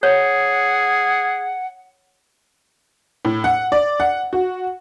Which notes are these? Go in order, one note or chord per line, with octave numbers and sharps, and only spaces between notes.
G#4 C#5 F#5
A2
F#5
D5
F#5
F#4